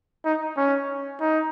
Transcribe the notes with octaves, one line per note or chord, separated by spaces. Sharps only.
D#4
C#4
D#4